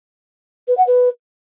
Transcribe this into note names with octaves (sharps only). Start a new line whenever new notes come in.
B4
F#5
B4